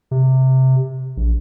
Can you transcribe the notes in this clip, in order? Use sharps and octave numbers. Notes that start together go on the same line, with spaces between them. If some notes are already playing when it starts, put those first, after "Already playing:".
C3
A#1